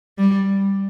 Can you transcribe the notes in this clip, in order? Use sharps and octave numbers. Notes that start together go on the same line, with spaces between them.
G3